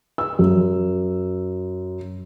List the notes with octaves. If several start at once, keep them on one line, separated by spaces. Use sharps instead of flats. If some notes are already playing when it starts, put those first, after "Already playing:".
E6
F#2